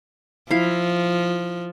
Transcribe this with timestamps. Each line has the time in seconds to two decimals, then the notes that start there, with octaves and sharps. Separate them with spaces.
0.51 F3 E4 F5